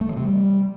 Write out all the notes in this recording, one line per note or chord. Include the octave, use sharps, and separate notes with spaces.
A3
E3
C3
G3